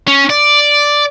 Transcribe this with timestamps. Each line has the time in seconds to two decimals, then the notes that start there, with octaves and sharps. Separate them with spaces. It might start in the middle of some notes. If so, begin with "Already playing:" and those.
0.07 C#4
0.30 D5